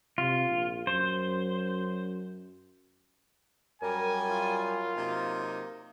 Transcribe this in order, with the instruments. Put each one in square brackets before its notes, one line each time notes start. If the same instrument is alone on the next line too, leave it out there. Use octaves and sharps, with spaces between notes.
[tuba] C3 [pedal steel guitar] F4
[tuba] A#1
[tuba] F#2 [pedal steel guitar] C5
[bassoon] F#2 [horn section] G3 G#5 [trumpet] A#4
[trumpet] F4
[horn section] C3 F#3 D#4 [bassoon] A#3